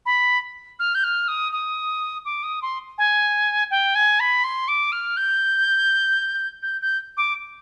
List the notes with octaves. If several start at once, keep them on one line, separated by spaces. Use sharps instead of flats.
B5
F6
G6
F6
D#6
D#6
D6
D#6
C6
G#5
G5
G#5
B5
C6
D6
F6
G6
G6
G6
D6